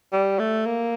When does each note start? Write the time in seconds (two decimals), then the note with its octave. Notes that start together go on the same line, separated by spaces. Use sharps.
0.13 G3
0.39 A3
0.66 A#3